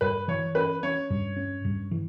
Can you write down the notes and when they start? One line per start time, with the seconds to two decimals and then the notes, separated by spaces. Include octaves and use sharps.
0.01 G2 B4
0.28 E3 C#5
0.55 C#4 B4
0.83 C#4 C#5
1.10 G2
1.37 C#4
1.65 G2
1.91 E3